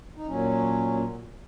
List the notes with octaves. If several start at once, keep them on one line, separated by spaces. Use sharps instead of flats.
D#4
A#2 F#3 C#4